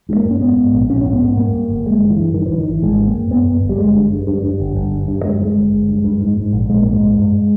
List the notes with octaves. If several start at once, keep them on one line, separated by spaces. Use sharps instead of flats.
G2 G#3
A#3
G2
C#4
G#2 B3
G#2
A#1
A#1 C#4
G#2 C#4
B3
G#2
G2 A#3
G2
G1
G1 G#3
G2
E3
G2
G2 D#3
G2 E3
D#3
G#1 E3
G#1 G#3
G2
A#3
G2
G2 B3
G2
G1
G3
G1 G#3
G2
G2
G2
G2
G1
G1
G2
G2
G2 G#3
G3
G2
G#3
G1
G1
G2
G2
G#2
G#2
A#1
A#1 G#3
A#3
G#2
G#3
G#2
G2